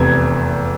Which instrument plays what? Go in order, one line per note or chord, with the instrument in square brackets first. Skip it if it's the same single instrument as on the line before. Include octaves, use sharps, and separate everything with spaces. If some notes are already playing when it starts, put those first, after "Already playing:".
Already playing: [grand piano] F1 E2 C3 G#6